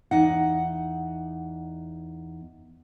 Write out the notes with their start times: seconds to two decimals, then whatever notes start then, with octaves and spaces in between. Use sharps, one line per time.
0.11 E2 D#4 F#5